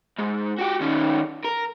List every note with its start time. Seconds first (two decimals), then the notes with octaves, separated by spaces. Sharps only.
0.18 G#2
0.58 F#4 G4
0.81 D#3 C#4
1.44 A#4